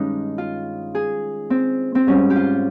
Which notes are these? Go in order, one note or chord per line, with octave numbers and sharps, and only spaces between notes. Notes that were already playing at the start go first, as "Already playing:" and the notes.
Already playing: G2 D#3 G#3 C#4 D#4
F4
G#4
C4
C4
G#2 G3 C#4
G4
F4